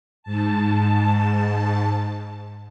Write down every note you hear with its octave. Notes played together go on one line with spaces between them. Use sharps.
G#2 A5